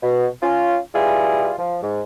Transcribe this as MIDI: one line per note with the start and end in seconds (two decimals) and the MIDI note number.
0.02 0.27 47
0.43 0.77 61
0.43 0.77 65
0.95 1.52 47
0.95 1.52 55
0.95 1.52 64
0.95 1.52 65
0.95 1.52 68
1.59 1.77 53
1.82 2.02 44